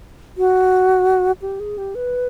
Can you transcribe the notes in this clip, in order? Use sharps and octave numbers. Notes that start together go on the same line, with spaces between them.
F#4
G4
G#4
G4
B4